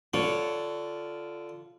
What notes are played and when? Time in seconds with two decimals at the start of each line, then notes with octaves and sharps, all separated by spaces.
0.14 D3 F4 C#5